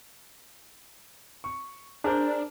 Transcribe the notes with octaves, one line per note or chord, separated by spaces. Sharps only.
C#6
D4 G#4 A#4 C5